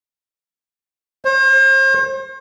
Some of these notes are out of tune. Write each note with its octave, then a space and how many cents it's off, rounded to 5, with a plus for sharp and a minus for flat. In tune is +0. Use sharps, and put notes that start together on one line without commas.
C5 +40